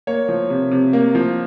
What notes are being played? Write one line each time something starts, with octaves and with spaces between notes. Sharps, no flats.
A#3 C#5
F3
C3
C3
A#3
F3